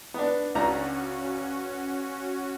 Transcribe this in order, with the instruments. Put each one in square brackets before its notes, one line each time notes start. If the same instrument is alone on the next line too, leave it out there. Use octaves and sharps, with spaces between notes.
[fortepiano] B3 D4
[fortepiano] C#2 D4 A#5 [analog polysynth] C#4 F#4